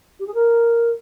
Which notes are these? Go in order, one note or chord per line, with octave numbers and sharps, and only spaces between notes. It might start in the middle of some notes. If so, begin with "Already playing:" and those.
G4
G#4
A#4